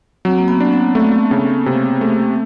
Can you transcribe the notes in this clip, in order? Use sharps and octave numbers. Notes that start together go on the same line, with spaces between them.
F#3 C4
A#3
B3
D4
C4
A3
C#3
C3
A3